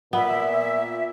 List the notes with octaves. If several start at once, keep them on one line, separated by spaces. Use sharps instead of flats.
A#2 B3 E5